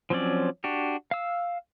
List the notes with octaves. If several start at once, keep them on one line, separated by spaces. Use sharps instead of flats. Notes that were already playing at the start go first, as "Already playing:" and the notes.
F3 F#3 C4 C#4 D5
D4 F#4 G4
F5 E6